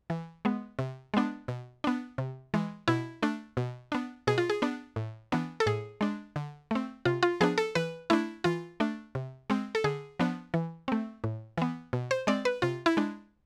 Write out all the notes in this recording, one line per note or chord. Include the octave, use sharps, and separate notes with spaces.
E3
G#3 B3
C3
G#3 B3 D4
B2
B3 D4
C3
E3 G#3
B2 E4
A3 D4
B2
B3 D4
B2 G#4
F4
G#4
B3 D4
A2
E3 B3 D4
A4
A2 G#4
G#3 D4
D3
A3 C4
C3 F4
F4
F3 B3 D4 G#4
A4
E3 B4
A3 D4 E4
E3 F4
A3 D4
C3
G#3 C4
A4
D3 G#4
F3 B3 D4
E3
A3 C4
A2
E3 B3
B2
C5
G#3 C4 D5
B4
C3 F4
E4
G#3 D4